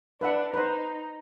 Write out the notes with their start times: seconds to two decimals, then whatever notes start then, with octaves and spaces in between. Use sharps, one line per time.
0.21 D4 B4 E5 F#5
0.54 D#4 B4 C5